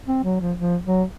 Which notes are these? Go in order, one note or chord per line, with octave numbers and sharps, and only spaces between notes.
C4
F#3
F3
F3
F#3